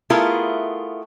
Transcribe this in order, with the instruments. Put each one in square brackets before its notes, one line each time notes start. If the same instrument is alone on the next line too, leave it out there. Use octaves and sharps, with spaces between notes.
[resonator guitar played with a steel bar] A3 B3 E4 F4 G#4 A#4